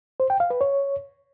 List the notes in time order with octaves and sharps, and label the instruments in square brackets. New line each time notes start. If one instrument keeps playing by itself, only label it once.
[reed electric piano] C5
G5
F5
B4
C#5